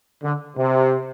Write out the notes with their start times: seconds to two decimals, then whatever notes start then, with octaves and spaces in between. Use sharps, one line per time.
0.23 D3
0.56 C3